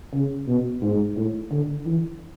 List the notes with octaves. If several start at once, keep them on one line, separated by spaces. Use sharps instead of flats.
C#3
B2
G#2
A2
D3
E3